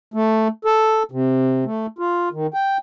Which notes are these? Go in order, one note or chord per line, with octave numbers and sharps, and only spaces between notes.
A3
A4
C3
A3
F4
D#3
G5